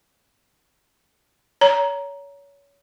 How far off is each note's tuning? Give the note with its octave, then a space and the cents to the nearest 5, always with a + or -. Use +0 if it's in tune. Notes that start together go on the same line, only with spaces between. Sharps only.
C#5 +25 A#5 +5